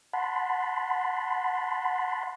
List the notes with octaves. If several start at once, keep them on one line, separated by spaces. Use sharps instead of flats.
F#5 A5 B5 C6